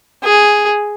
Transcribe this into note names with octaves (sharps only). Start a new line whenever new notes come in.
G#4